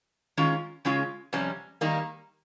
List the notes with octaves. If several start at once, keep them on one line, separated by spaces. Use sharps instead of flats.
D#3 G#3 C#4 F4
C#3 G#3 C#4 F4
F2 C3 G3 C#4
D#3 G3 A#3 D#4